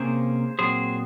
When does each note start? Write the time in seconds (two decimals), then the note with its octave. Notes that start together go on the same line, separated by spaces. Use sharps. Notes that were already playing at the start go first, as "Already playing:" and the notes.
Already playing: C3 A#3 C#4 G#4 C5
0.59 A#2 F#3 C4 G#4 C5